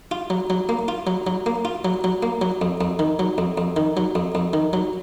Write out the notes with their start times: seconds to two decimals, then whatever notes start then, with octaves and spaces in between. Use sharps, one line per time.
0.11 F4
0.30 F#3
0.50 F#3
0.69 A#3
0.88 F4
1.07 F#3
1.27 F#3
1.46 A#3
1.65 F4
1.85 F#3
2.04 F#3
2.23 A#3
2.41 F#3
2.62 F2
2.81 F2
2.99 D#3
3.19 F#3
3.38 F2
3.58 F2
3.76 D#3
3.97 F#3
4.15 F2
4.35 F2
4.53 D#3
4.73 F#3